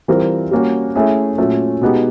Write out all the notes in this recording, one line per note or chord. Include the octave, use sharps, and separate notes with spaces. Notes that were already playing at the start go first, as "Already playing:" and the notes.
E3 G3 C4 F4 A#4
G3 A#3 C#4 F#4
A3 C#4 E4 G#4
A#2 F#3 A3 C#4
B2 G#3 B3 D#4 G4